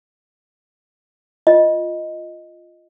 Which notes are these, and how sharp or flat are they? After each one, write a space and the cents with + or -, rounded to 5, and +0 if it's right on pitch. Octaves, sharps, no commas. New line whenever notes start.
F4 +0 D#5 +0